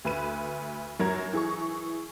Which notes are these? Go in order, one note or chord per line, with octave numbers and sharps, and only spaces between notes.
D2 B4 D#7
F#2 F#3 A#4 A#5 G#6
E3 G#4 C#6